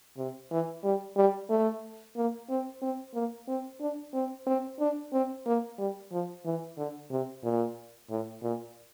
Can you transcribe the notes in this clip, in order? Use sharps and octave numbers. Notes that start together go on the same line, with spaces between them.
C3
E3
G3
G3
A3
A#3
C4
C4
A#3
C4
D4
C4
C4
D4
C4
A#3
G3
F3
E3
D3
C3
A#2
A2
A#2